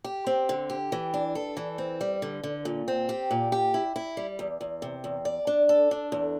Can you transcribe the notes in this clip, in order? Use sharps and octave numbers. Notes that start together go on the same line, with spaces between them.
G4
C4
D3
G4
E3
D4
A4
E3
C4
G3
D3
D3
A#2
C4
G4
A#2
G4
E4
E4
G3
E2
E2
C3
E2
D5
D4
A4
D4
E2